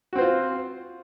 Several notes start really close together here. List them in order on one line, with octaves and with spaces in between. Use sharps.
F#4 C4 C5 F4